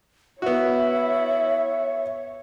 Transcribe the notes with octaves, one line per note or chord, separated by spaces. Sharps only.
B3 E4 F#4 C#5 E5